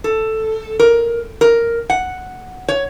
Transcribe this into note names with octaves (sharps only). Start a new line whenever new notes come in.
A4
A#4
A#4
F#5
C#5